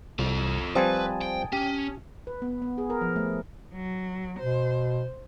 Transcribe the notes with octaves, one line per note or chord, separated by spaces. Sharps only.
C2 F4 A4
F3 G3 C4 B4 G#5 A5 D#6
G5
C#4 G4
B4
B3
B3
G#4
A#4
F3
A3
F#3
B2 C5